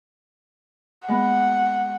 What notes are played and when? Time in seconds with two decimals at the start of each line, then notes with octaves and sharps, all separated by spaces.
1.08 G#3 B3 F#5